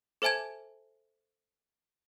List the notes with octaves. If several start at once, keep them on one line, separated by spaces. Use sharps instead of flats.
A4 C5 E5 G#5 A5 G#6